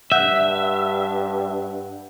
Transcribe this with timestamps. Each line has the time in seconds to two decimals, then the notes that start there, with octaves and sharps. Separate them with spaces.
0.12 G2 E5 F#5 F#6 G6